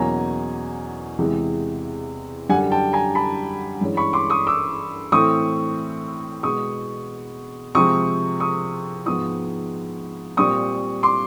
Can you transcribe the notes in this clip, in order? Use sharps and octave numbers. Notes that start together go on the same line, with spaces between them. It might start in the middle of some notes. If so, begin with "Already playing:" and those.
Already playing: E2 B2 F#3 A#3 C#4 G#5 A#5
E2 C3 E3 G#3
F#2 D3 G3 F#5 G#5
G5 A5
G#5 A#5
A5 B5
G2 E3 G#3 C#4
B5 C#6
C6 D6
C#6 D#6
D6 E6
A2 E3 A3 C4 C#6 D#6
B2 G#3 B3 C#6 D#6
C3 F3 G#3 C4 C#6 D#6
C#6 D#6
G#2 F3 G#3 B3 C#6 D#6
A#2 G3 C4 C#6 D#6
C6 D6